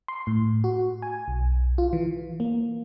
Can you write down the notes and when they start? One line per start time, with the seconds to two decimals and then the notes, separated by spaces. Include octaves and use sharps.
0.08 C6
0.27 A2
0.64 F#4
1.02 G#5
1.28 B1
1.78 F4
1.93 E3
2.40 A#3